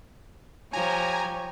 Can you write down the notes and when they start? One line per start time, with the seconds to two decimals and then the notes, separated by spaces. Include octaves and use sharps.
0.73 F3 G4 C#5 G#5 A#5